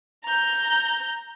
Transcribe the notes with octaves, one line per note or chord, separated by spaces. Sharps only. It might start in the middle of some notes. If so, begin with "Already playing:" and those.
A#5 G6